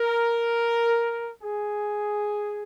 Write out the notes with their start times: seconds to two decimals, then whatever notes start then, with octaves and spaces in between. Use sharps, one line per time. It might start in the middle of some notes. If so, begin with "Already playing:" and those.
Already playing: A#4
1.43 G#4